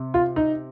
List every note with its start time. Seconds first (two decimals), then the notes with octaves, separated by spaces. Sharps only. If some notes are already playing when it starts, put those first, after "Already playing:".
Already playing: C3
0.14 F4
0.36 D#4